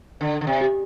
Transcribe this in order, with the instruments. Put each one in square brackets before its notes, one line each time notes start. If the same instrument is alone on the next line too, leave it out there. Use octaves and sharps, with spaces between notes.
[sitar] D3 [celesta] D#5
[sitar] D3
C3
[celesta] G4